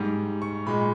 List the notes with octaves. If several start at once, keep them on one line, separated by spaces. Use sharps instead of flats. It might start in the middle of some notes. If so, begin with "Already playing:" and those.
Already playing: G#2 G3
C#6
A#2 G#3 B5